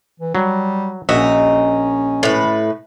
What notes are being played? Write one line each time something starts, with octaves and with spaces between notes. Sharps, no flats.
E3
F#3 G3
A#1 C#4 D#4 F#4 E5
A2 B4